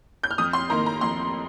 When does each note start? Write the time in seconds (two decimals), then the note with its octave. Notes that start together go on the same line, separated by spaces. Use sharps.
0.23 G6
0.31 F6
0.38 F2 D#6
0.53 C6
0.70 D#3 A#3 A#5
0.86 A#5
1.01 F2 C6